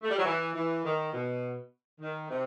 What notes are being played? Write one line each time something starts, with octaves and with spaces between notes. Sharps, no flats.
A3
G3
F#3
E3
E3
D#3
B2
D#3
C3